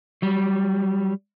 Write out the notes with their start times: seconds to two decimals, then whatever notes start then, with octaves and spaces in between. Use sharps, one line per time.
0.22 F#3 G3